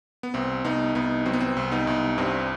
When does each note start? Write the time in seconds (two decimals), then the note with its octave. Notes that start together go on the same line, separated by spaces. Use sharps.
0.23 B3
0.34 C2 C4
0.64 C2 B3 D#4
0.95 C2 B3 D#4
1.25 F#3 C4
1.33 B3
1.41 C4
1.57 C2
1.72 B3 D#4
1.87 C2
2.18 G2 C4